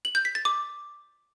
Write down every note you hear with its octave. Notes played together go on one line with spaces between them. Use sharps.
F#7
G6
B6
A6
D6